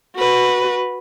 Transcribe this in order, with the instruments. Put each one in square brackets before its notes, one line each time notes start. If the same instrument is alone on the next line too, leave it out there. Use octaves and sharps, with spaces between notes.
[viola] F#4 B4